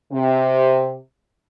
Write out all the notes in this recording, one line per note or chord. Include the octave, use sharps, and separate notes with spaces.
C3